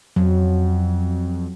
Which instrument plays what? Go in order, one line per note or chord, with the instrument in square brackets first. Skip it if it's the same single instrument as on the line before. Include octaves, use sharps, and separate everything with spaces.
[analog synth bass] F2 [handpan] F#3